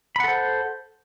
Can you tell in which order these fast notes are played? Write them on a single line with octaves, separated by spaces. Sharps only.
B5 F#5 A4 C5